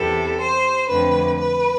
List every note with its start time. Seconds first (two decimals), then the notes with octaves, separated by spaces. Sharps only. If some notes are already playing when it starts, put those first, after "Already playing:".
Already playing: E2 C3 G3 A4
0.41 C5
0.89 F2 D3 A3 C4 B4
1.38 B4